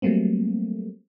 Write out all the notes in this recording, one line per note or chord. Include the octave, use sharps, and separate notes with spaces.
F#3 G3 A3 A#3 C4